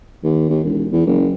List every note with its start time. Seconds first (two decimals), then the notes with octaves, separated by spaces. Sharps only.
0.23 D#2
0.49 D#2
0.64 E1
0.92 E2
1.07 F#1